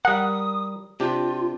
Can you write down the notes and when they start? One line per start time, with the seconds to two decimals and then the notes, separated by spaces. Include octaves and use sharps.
0.05 G3 A#4 F#5 D#6
1.00 C3 D4 F4 G4